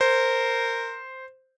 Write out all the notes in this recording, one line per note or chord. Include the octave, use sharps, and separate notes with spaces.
A#4 C5